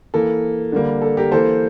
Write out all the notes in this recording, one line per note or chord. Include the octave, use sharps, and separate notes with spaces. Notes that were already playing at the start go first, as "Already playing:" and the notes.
E3 A#3 A4
D3 G3 A#3
A4
G4 A#4
E3 A#3 A4 C5